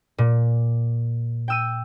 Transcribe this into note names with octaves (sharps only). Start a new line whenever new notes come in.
A#2
G5 E6 D#7